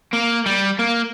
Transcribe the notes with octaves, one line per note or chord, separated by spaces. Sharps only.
A#3
G3
A#3